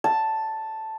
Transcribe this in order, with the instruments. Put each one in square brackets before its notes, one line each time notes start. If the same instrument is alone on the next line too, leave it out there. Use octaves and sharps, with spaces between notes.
[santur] A5